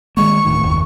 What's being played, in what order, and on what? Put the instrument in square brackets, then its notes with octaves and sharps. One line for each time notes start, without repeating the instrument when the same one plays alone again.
[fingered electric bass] D#3 G#3 A#3 [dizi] C#6
[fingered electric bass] D1 A2 D#3
F#1 D#2